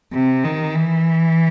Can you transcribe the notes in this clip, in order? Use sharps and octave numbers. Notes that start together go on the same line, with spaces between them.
C3
D#3
E3